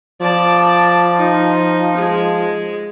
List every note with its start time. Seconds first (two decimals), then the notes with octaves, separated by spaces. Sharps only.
0.22 F3 D5 A5
1.18 D#4
1.97 G#3